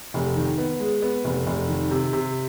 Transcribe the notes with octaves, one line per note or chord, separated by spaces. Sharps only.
F1
D#3
B3
G#3
B3
F1
F1
D#3
C3
C3